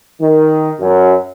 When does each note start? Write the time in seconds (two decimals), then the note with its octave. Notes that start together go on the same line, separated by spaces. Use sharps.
0.20 D#3
0.79 F#2